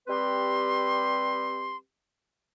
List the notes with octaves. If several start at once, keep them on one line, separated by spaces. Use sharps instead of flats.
G3 C4 G4 B4 C6